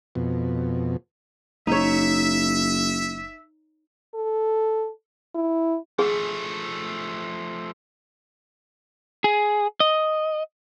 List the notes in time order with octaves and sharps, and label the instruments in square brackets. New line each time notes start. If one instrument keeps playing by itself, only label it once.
[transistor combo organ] F2 B2
[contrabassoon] F#1 [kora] D#4 C#5 [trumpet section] E5
[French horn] A4
E4
[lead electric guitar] F3 A3 [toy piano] G#4
[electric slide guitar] G#4
D#5